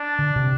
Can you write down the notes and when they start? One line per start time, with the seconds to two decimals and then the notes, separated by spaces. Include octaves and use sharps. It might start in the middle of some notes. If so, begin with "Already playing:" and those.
Already playing: D4
0.19 D3
0.36 C3